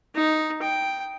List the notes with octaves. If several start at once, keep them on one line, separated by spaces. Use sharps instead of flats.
D#4
G5